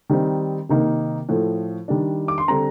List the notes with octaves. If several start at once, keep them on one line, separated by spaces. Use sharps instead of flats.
D#3 G3 C4 D#4
C3 D#3 A#3 D#4
A2 F3 A3
D#3 G3 D4
D6
C6
D3 G3 C4 A#5